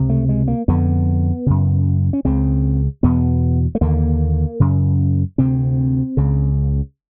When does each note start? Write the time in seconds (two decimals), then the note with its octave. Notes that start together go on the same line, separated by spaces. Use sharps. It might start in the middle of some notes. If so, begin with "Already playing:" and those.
Already playing: C#2 C3
0.09 A3
0.29 G#3
0.48 A#3
0.68 F2 D3 B3
1.46 F#2 C#3
2.13 C#4
2.25 C#2 C#3 C4
3.03 E2 B2 B3
3.75 A3
3.81 D#2 D3 A#3
4.60 F#2 C#3
5.38 D2 C3 C4
6.17 C#2 C#3